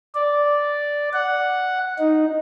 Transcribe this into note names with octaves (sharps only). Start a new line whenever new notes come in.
D5
F#5
D#4